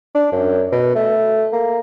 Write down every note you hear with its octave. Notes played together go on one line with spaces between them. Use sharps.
D4
F#2
B2
A3
A#3